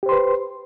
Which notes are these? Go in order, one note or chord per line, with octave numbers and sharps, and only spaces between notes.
G4 B4 C5 C6